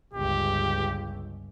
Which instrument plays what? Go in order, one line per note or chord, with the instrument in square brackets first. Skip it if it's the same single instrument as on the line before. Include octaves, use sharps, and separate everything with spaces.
[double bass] G1 C#2 [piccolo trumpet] G4